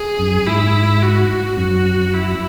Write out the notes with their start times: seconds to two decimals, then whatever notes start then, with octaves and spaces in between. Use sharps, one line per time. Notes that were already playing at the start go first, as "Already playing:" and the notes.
Already playing: G#4
0.19 F#2
0.47 G#2 E4
1.02 F#4
1.57 F#2 F#4
2.14 E4